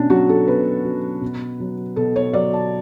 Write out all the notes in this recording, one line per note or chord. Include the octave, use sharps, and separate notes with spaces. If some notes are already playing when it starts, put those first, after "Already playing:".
Already playing: B2 C#4 D4
F#3 F#4
A4
B2 B4
F#3
B2
F#3
B2 A4
C#5
F#3 D5
A5